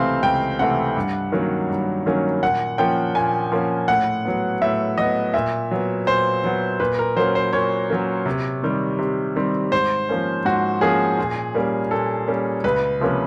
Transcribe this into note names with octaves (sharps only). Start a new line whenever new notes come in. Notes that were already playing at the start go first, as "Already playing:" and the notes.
Already playing: C#2 C3 E3 A3 C4 C5 F5
C#2 G5
C3 E3 A3 C4 F#5
G2
D#3 F#3 A#3 C#4
G2
D#3 F#3 A#3 C#4
A#2 F#5
F3 A#3 C#4 G5
A#2 G#5
F3 A#3 C#4
A2 F#5
F#3 B3
A2 E5
F#3 B3 D#5
A#2 E5
F#3 B3
A#2 C5
F#3 B3
A#2 B4
A#4
F#3 A#3 C#4 C5
C5
A#2 C#5
F#3 A#3 C#4
C3
D#3 G3 C4
C3
D#3 G3 C4
G#2 C5
F3 A#3 C#4
G#2 F#4
F3 A#3 C#4 G#4
A#2
G3 A#3 C#4
A#2 A4
G3 A#3 C#4
C#2 B4
C3 F3 A#3 C#4